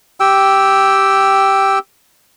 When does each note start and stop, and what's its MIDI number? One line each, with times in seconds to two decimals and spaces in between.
0.20 1.79 67
0.20 1.79 79
0.20 1.79 88